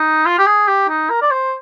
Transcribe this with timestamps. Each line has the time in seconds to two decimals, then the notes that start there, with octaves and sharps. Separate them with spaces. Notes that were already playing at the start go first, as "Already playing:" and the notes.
Already playing: D#4
0.26 F4
0.39 G4
0.46 G#4
0.67 G4
0.89 D#4
1.10 A#4
1.22 D5
1.31 C5